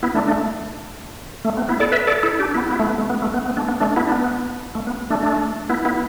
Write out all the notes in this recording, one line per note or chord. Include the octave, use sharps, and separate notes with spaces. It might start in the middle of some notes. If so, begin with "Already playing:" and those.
B3 E4
A3 D4
A3 D4
A3
B3
B3 E4
A4 D5
B4 E5
A4 D5
E4 A4
D4 G4
B3 E4
B3 E4
A3
B3
A3
B3
A3
B3
B3
A3 D4
B3
A3 D4
B3 E4
D4
B3
A3
B3
A3 D4
A3 D4
B3 E4
B3 E4